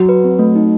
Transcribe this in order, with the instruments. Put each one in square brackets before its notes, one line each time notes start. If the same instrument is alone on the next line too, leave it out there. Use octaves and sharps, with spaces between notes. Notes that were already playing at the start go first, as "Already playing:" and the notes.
Already playing: [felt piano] F#3 [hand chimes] F#4
[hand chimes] B4
C4
A3
D#4